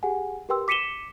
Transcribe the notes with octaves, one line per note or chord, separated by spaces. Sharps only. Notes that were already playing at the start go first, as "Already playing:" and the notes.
G4 G#4 F#5 G#5
G4 A#4 B4 G5 C6 E6
D6 B6 C#7 D#7 E7 G7